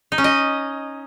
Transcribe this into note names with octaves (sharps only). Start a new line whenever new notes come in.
D#4
C#4
D#5